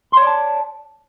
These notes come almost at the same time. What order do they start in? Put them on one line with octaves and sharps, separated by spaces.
C6 C#5 D5 A5